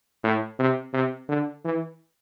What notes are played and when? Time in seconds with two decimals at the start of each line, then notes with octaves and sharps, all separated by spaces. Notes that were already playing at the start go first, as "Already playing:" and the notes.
0.24 A2
0.59 C3
0.94 C3
1.29 D3
1.65 E3